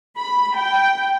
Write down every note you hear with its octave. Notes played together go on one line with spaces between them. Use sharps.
B5
G5